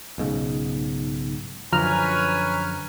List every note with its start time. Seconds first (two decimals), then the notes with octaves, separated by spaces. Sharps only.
0.18 B1 G#2 C#3
1.72 F#2 D3 F3 B4 C#5 G#5 A#5 F6